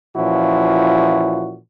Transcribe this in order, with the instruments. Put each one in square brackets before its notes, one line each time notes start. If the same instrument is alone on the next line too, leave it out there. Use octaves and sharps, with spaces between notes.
[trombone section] A#2 E3 F3 C#4 E4 F#4